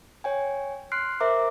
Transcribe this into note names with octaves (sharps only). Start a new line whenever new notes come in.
C#5 G5 G#5
C6 F6 F#6 C7 D7
A#4 C5 E5 A#5 D6